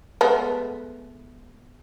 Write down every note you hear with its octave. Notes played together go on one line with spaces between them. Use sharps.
G#3 A3 B3